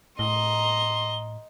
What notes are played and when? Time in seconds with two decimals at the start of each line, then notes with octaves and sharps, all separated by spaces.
0.19 A2 D#5 A#5 C6 G7